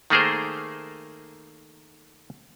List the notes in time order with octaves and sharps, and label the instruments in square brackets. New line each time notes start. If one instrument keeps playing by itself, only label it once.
[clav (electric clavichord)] D#3 A3 A#3 G#4 A#4 C5